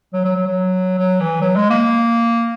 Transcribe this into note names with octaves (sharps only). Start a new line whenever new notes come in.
F#3
F#3
F#3
F#3
F#3
E3
F#3
G#3
A#3